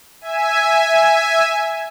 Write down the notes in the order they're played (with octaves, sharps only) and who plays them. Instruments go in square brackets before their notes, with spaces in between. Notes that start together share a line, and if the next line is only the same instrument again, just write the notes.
[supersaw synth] E5 G#5